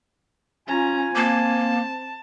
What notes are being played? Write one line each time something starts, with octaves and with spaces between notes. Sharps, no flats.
C#4 F4 G#5 A#5
A#3 C4 A5